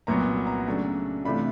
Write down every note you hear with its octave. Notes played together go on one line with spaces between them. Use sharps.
C2 A#2 F#3 B3 A#5
A#5
C#3 F#3 A3 D4
C3 E3 A3 D4 F4 B5